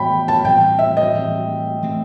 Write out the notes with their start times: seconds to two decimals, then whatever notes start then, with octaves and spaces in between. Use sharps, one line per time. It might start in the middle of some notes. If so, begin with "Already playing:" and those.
Already playing: A2 E3 B3 G5 B5
0.28 A5
0.45 A2 E3 G3 C4 G5
0.79 E5
0.97 D#5
1.14 A2 E3 G3 C4
1.82 E3 A3 C4